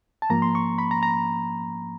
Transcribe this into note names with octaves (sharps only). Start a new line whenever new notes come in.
A5
G#2 F3 A#3 A#5
C6
C#6
B5
A#5
A#5